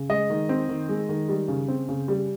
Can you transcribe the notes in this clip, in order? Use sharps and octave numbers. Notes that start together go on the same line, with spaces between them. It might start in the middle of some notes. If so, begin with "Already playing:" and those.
Already playing: C#3
G#3 D#5
D#3
C4
D#3
G#3
D#3
G3
C#3
C4
C#3
G3